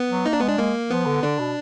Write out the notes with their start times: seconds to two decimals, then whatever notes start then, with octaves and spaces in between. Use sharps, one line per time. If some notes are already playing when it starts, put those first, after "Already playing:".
Already playing: B3
0.10 F#3
0.26 A#3 D#4
0.33 D4
0.40 G#3 B3
0.49 D4
0.58 G#3 A#3
0.90 F3 B3
1.06 D3
1.23 D3 D4
1.39 B2